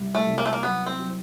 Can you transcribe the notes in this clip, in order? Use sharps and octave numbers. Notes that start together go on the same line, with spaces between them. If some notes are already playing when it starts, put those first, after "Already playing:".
Already playing: C2 G3
A3
C2
A#3
A3
A#3
F#3 B3
C4
F#3